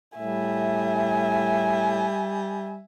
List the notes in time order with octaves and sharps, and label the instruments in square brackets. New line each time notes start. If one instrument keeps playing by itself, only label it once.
[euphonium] A2 [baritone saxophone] G3 [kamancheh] E5 G#5